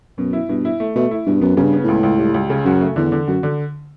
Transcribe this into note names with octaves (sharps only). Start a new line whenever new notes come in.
F#2 B2
E4
G2 B2
E4
A3
B2 A3
E4
G2 B2
F#2 B3
F#2 C#3
G2
B3
C#2 A2
C#2
G3
C#2
C#3
F#2 F#4
A3
E2 D3
D3
F#2 F#4
D3